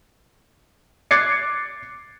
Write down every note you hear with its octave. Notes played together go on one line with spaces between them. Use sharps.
D6 F#6 G#6 A6 C7 C#7